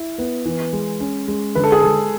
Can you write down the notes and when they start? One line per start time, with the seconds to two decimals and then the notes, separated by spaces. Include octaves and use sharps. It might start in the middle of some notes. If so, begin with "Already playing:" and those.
Already playing: E4
0.18 B3
0.45 E3
0.73 G#3
1.00 C#4
1.28 G#3
1.55 D3 B4
1.64 A4
1.72 G#4
1.81 G#3 A4